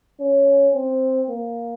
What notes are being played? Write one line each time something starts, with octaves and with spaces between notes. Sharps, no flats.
C#4
C4
A#3